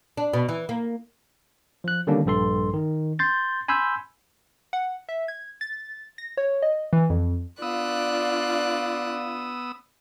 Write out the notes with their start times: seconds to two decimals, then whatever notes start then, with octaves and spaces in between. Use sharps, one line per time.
0.17 D4
0.33 B2
0.49 E3
0.69 A#3
1.84 F3 F#6
2.07 D3 D#3 G3 A#3 C#4 D4
2.26 A#1 G2 A4 C6
2.74 D#3
3.19 C6 G6 A6
3.68 G#5 B5 C6 E6 G6
4.73 F#5
5.09 E5
5.28 G#6
5.61 A6
6.18 A#6
6.37 C#5
6.62 D#5
6.93 E3
7.10 F2
7.62 B3 D4 F4 D5 F5 D#6 E6 F#6